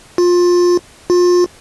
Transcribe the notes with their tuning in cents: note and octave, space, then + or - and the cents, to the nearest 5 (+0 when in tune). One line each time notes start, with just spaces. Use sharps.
F4 +20
F4 +30